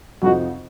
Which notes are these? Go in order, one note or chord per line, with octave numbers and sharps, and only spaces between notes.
F2 C3 F3 C4 D#4 F#4